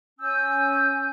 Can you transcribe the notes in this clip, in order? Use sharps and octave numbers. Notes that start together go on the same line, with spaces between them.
C#4 G#5 E6 G6